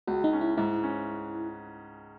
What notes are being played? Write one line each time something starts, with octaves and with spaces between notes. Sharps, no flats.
C#2 F#4
D#4
C#4
E4
G#2 E4
C#4